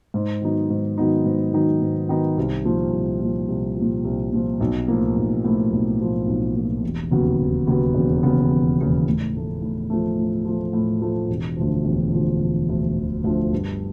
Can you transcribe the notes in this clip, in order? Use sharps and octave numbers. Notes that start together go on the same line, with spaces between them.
G#2
D#3 F#3 B3 D#4
G#2
D#3 F#3 B3 D#4
G#2
D#3 F#3 B3 D#4
G#2
D#3 F#3 B3 D#4
C2
A#2 F3
C2
A#2 F3
C2
F3
A#2
C2
A#2 F3
B1
A2 F3 A#3
B1
A2 F3 A#3
B1
A2 F3 A#3
B1
A2 F3 A#3
E1
D#2 C#3 F#3 B3
E1
D#2 C#3 F#3 B3
E1
D#2 C#3 F#3 B3
E1
D#2 C#3 F#3 B3
A2
F3 A3
A2
F3 A3
A2
F3 A3
A2
F3 A3
E1
D2 D3 F3
E1
D2 D3 F3
E1
D2 D3 F3
E1
D2 D3 F3
G2